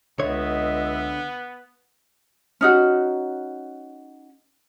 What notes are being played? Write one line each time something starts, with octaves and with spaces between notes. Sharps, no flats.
C#2 D3 B3 C#5 D#5 E5
C#4 D#4 F#4